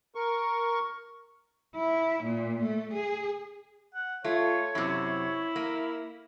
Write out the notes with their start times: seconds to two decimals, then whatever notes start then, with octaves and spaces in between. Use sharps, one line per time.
0.15 A#4 C#6
1.75 E4
2.24 A#2
2.63 A3
2.93 G#4
3.94 F#5
4.24 A3 F4 C#5
4.75 F#2 C3 E4
5.56 A#3